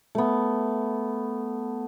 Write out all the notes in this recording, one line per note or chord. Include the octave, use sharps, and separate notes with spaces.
A3 B3